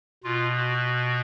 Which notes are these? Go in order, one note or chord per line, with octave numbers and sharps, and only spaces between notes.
B2 F4
F#4